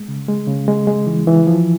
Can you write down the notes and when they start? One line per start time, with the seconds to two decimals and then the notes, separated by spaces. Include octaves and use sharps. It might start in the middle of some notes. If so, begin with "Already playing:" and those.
Already playing: G#3
0.08 C#3
0.28 G#3
0.47 C#3
0.68 G#3
0.87 G#3
1.07 E3
1.27 E3
1.47 F3